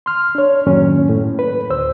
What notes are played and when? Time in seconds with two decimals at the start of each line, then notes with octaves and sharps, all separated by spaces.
0.06 C6 F6
0.35 D4 C#5
0.67 F#2 A2 D#3 F#3 A#3 C#4
1.10 A2
1.39 B4
1.70 D2 C5 E6